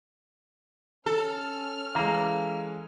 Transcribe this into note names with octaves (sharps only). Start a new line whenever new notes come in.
C#4 A4 F6
E3 G#3 F5 A#5